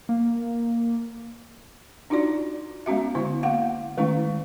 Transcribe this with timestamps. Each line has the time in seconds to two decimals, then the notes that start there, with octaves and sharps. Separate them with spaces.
0.09 A#3
2.10 D4 D#4 F4 F#4 D5
2.86 G#3 B3 C#4 F#4 E5
3.15 D3 B3 E4
3.43 A#3 F5 F#5
3.97 D#3 G#3 A3 C#4 E4